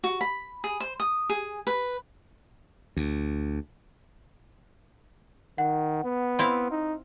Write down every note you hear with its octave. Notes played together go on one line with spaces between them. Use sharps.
F#4
B5
G#4
C5
D#6
G#4
B4
D2
D#3 F#5
B3
C4 E4 F5
D#4